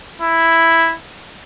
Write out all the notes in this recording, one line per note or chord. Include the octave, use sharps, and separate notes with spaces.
E4